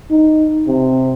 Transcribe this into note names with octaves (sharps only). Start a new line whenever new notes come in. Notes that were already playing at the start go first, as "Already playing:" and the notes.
D#4
C3